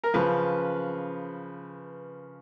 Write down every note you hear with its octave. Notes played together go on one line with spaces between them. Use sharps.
A#4
C#3 F3 B4